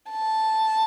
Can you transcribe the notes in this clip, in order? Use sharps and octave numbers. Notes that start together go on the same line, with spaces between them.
A5